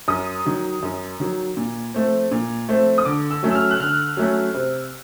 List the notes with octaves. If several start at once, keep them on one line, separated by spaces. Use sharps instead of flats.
F#2 D#6
D#3 F#3
F#2
D#3 F#3
A#2
F3 A3 C4
A#2
F3 A3 C4
D#6
D3 D6
E6
F#3 A3 C#4
E6
F6
F#6
D3 F6
F#3 A3 C#4
C3